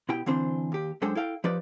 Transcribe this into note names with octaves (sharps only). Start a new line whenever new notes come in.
B2 E4 G4 G5
D3 E3 C4 D4 C5
D#2 G4
F#2 G#3 D4 A4 C5 G5
E4 A4 F5 G5
F3 D#4 G4 B4 D5